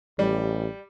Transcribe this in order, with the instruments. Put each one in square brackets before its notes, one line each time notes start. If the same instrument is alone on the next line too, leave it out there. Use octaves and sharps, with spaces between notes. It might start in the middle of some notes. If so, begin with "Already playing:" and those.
[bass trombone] A1 [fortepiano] G3